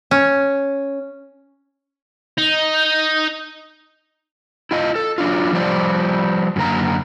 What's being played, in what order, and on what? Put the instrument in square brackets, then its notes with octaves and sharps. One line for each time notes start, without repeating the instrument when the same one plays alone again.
[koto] C#4
[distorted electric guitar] D#4
[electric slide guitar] E4 F4 D#5
A4
F#3 D4 F4
F3 G3 C5 D5
F#2 D3 A#3 A#5